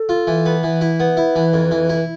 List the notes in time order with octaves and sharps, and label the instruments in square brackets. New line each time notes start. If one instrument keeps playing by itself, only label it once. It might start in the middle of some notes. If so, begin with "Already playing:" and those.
Already playing: [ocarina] A4
[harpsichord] F4
E3
B3
E3
E4
[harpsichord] B3 [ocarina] B4
[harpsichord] E4
E3
F2
E3
E4